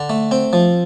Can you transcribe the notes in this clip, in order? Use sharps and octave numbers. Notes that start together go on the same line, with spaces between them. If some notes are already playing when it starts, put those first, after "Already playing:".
Already playing: D3
A3
C4
F3